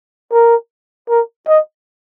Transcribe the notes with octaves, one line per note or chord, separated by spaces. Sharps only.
A#4
A#4
D#5